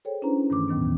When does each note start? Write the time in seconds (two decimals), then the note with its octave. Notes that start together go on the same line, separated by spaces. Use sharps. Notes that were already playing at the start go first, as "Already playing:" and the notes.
0.05 G#4 A4 C5 C#5 G5
0.22 C#4 D4 E4 B4 C5 A#5
0.50 G2 D#3 E3 A3 D6
0.68 D#2 A2 D#3 F#3 B3
0.82 D#2 E3